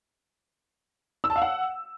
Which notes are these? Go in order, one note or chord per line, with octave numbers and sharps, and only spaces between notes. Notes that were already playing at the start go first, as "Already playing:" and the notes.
E6
A5
F5
F#5